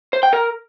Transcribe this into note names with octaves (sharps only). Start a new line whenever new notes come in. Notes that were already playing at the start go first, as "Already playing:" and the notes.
C5
G5
A#4